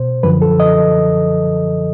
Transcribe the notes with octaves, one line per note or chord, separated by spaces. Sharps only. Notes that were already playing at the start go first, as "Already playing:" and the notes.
Already playing: B2 C5
F#2 D3 F3 B4
A4
D#5